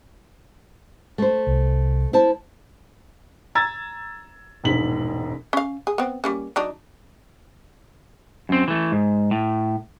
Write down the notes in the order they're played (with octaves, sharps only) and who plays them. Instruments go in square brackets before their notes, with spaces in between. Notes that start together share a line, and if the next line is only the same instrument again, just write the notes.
[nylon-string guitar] A3 C5
[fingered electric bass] C2
[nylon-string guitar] E4 C5 A5
[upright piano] A#5 E6 G#6 A6
E1 A#1 G#2 B6 F#7
[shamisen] C#4 F5
G#4
B3 C4
G3 A#3 C#4
F#3 D4 D#4
[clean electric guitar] F#2 C4
E3 A3
G#2
A2